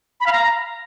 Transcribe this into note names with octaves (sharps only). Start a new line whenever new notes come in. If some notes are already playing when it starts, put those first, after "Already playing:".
B5
F5
A#5